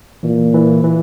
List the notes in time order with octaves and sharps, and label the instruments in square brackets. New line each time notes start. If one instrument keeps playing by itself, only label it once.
[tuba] A#2 [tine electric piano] E3
[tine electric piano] E3
E3